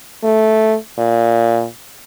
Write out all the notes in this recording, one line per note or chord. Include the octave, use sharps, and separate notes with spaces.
A3
A#2